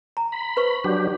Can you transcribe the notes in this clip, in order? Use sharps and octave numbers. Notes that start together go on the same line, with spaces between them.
A#5
B5
B4 C5 C#6
F#3 D4 G4